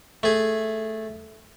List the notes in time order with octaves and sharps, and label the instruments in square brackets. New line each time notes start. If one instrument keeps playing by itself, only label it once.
[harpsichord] A3 G#4